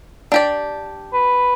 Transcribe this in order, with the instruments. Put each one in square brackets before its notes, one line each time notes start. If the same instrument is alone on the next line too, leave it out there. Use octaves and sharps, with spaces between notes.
[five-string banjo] D4 G4 D5
[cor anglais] B4